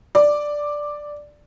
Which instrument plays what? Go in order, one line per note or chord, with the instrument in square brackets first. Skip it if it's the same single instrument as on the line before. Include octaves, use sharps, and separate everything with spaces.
[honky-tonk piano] D5